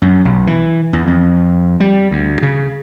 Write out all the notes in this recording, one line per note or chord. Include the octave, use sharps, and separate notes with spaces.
F#2
B1
E3
E2
F2
G3
D2
C#3